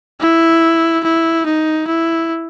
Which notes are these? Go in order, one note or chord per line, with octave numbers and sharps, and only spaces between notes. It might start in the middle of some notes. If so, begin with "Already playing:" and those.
E4
E4
D#4
E4